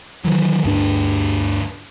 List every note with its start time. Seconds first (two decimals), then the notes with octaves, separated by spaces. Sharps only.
0.25 D#3 E3 F#3
0.64 D2 G2 D4